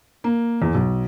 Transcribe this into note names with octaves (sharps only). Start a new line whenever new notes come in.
A#3
E2
B1